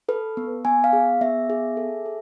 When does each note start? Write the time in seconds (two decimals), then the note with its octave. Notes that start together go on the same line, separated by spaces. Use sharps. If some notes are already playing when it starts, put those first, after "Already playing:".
0.09 A4 B4
0.37 B3
0.65 B3 G#5
0.84 F5
0.93 G#4
1.21 B3 E5
1.50 G#4
1.77 A4
2.06 A4